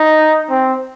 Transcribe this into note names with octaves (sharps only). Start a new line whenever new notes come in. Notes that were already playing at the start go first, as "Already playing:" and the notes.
Already playing: D#4
C4